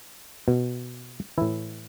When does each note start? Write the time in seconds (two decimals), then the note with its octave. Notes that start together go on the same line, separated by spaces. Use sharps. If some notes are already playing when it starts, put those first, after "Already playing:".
0.48 B2
1.38 A2 E3 E4